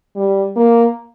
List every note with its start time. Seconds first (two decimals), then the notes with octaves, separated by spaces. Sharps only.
0.16 G3
0.56 A#3